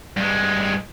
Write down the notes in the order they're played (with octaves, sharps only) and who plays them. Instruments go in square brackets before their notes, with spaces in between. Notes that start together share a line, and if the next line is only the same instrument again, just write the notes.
[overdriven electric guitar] G2 G#3